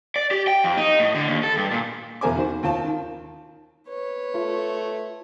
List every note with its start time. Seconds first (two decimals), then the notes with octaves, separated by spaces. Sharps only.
0.16 D5
0.31 G4
0.48 G5
0.64 F2
0.77 D#4
1.00 A2
1.15 D3
1.28 D#2
1.43 A4
1.57 G2
1.71 A#2
2.21 E2 B2 A#4 C5 G#5 D6
2.36 D#3 F#4 C5
2.63 D#2 F4 A5
2.85 D#3
3.88 B4 C#5
4.35 A3 F4